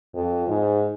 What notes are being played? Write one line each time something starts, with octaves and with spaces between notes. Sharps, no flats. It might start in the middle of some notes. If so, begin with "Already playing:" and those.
F2
G#2